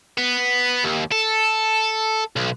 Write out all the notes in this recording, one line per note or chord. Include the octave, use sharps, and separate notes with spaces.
B3
D#2
A4
B1